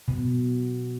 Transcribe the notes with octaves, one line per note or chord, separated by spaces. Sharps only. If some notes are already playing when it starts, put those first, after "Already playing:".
B2